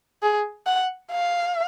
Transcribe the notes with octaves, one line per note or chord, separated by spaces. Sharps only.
G#4
F#5
F5